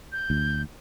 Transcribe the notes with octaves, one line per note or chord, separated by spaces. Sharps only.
G6
D2